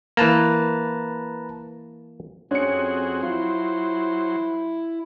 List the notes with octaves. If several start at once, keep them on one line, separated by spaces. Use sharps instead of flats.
E3 A#3 B4 A5 A#5
F2 C4 C#4 F#4 G#4 C#7
F#3 E4 F4 C5